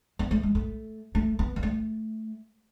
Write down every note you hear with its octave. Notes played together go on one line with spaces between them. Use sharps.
B3
A3
G#3
A3
A3
B3
B3
A3